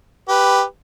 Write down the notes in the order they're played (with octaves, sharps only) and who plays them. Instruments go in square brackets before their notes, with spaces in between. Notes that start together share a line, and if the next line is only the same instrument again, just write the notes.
[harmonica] G4 B4